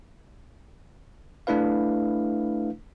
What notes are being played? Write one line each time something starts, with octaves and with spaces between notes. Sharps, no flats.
A3 D4 E4 B4 F5